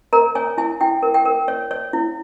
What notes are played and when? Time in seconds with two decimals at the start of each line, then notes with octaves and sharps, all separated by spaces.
0.13 A#4 A#5
0.35 C#5 G#5
0.58 E4 G#5
0.81 E4 G5
1.03 A#4
1.14 G5
1.25 A#4
1.48 C#5
1.71 C#5
1.93 E4